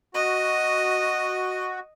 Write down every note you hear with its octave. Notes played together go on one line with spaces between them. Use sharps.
F#4 D#5